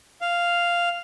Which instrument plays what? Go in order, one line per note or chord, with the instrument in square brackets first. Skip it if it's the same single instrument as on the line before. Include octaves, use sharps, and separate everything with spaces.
[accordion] F5